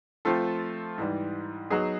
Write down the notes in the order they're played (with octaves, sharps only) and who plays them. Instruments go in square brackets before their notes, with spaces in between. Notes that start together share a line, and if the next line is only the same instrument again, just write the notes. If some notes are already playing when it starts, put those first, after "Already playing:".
[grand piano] F3 A3 C4 F4 A4
G#2 E3 G3
F#3 B3 D#4 G#4